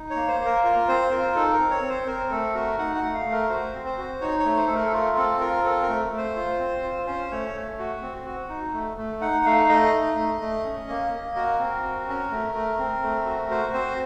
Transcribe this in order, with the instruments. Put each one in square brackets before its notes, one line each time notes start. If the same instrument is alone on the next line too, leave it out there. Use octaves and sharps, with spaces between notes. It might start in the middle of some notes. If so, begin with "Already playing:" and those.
Already playing: [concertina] D#4
C#5
A#3
C5
A#3
A#4
F4 A#4
C4 C5
F4 A#4
D#4 A4
A#4
C4
C#5
C4
C5
C4 A#4
A3 A4
F#4 A#4
D#4 F#5
F#5
A3
F5
A3
A#4
F#4 C5
C4
C5
F#4
D#4 C#5
C#5
A3
C5
A3 A4
A#4
A4
F4 A#4
C4 A4
F4 A#4
C4 A4
A#4
A3
A3
C5
F4
C4
F4
C#4 C5
A3 C#5
A3
F#4
C4
F#4
D#4
A3
A3
D#4 F#5
A3 F5
A3 D#5
D#4
A3
A3
C#4
A#3
A#3
F#4 A#4
C4
F#4
C#4
A3
A3
C4
A3
F#4
F#4 C5
C4 C5